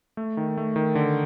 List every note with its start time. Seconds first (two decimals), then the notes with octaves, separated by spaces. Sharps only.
0.17 A3
0.37 D#3
0.57 A3
0.76 D#3
0.95 D3